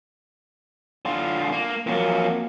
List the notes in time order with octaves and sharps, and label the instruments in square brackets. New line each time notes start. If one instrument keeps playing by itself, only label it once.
[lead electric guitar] D3 F4
A#3
[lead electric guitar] F2 F#3 [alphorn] A#3